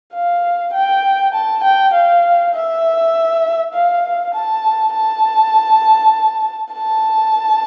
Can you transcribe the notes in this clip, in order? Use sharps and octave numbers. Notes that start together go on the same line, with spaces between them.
F5
G5
A5
G5
F5
E5
F5
A5
A5
A5